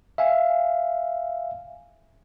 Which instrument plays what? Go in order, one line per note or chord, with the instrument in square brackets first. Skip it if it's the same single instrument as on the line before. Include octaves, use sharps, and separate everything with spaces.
[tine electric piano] E5 F5 G#5